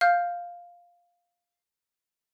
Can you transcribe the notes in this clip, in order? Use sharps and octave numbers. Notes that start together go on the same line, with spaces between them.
F5 F6 G6